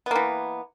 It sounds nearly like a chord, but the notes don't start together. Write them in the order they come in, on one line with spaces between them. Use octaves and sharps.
B3 A#3 E3